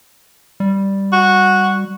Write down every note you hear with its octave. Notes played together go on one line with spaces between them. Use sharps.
G3
F#4